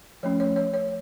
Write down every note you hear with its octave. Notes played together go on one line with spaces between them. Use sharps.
F3 A3 C#4 C#5
C#5
C#5
C#5